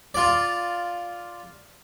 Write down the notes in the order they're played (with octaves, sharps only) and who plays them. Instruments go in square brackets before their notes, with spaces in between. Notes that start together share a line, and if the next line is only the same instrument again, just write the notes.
[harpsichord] F4 D5